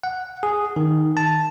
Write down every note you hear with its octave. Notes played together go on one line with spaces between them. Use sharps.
F#5
G#4
D#3
A5